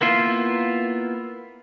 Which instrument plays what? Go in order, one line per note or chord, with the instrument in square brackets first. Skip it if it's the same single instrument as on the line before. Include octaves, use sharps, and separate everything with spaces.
[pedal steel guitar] A#3 B3 E4 F4